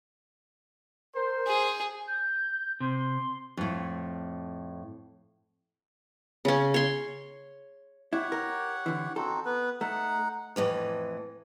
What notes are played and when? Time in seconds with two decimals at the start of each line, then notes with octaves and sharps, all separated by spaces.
1.14 A#4 C5
1.47 G#4
2.08 G6
2.80 C3 C6
3.57 F2 A2
6.45 C#3 C#4
6.74 C#5 C6
8.13 E4 G4 C#5 F#5
8.32 A#4
8.86 D3 E3
9.16 C4 D#4 F#4 A4
9.45 B3 B4
9.81 A3 D#4 F#5
10.56 F2 A2 E3